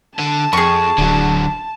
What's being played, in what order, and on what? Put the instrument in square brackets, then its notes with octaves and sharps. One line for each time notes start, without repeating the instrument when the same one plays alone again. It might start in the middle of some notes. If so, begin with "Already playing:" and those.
[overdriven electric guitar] D3 [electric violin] A5
[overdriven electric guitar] F2 [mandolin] G#4 C#6
[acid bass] D1 [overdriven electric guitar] D3 F#3